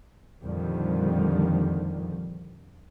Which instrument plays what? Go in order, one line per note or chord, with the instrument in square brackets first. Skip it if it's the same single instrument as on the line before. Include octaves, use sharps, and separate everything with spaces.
[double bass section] F2 A#2 D3 D#3 F3 G3